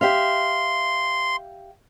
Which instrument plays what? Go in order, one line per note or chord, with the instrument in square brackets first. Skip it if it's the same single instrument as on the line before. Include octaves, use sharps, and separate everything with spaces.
[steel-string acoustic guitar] G4 E5 F5 [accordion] C6